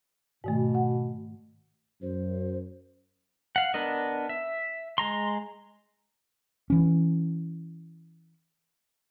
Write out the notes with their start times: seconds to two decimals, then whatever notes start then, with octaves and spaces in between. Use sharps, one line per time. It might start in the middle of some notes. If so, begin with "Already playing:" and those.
0.44 G#2 B2 D#3 A3
0.75 F#5
2.02 F#2 C5
3.56 F5 F#5
3.74 B3 D4 A#4 D#5
4.29 E5
4.98 G#3 A#5 C6
6.70 E3 C#4